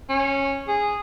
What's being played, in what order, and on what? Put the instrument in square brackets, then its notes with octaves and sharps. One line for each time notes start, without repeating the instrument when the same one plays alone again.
[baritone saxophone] C#4
G#4